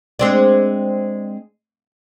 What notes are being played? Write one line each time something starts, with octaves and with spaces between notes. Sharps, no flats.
G#3 C4 D4